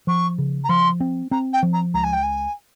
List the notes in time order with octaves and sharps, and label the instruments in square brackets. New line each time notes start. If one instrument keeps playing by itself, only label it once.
[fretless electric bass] F3 [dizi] C#6
[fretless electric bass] C#3
[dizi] A#5
[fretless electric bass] F3 [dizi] C6
[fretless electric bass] C4
[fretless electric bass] C4 [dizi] A#5
[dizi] G5
[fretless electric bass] F3
[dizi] A#5
[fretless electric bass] C#2 [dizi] A#5
[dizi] G#5
G5
G#5